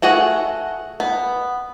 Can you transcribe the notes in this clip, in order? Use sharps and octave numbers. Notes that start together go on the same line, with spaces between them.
A3 F#4 G#4 F#5
B3